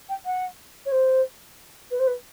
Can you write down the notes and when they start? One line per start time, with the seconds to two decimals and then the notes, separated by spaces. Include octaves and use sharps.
0.09 G5
0.25 F#5
0.85 C#5
0.91 C5
1.91 B4
1.99 C5
2.07 B4